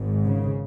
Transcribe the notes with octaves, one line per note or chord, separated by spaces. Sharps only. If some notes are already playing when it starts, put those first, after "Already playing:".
Already playing: G#1 G#2
C#3